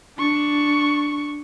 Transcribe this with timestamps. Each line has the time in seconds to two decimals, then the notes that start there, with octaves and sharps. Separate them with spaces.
0.19 D4 C#6